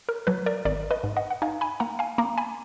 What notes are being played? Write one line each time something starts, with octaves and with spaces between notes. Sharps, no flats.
A#4
F#3 B4
A#4 D5
G#1 A#4 D5
B4 D#5
G#2
D#5 F#5
F#5
D#4 F5 G#5
G#5 B5
A#3 F#5 A#5
F5 G#5
A#3 A#5 D6
G#5 B5